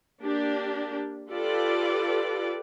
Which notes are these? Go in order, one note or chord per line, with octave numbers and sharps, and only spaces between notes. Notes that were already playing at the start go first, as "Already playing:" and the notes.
A#3 D4 G4
F4 G4 A4 B4 D5